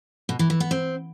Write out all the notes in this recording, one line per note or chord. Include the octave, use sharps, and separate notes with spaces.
B2
E3
E3
B3
C4